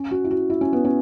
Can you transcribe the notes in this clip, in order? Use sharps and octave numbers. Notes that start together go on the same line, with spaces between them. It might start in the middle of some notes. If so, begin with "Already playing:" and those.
Already playing: C#4
F#4
E4
F#4
E4
C#4
B3
C#4